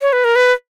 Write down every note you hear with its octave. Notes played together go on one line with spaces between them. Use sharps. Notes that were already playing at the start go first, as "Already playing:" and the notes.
C#5
B4
A#4
B4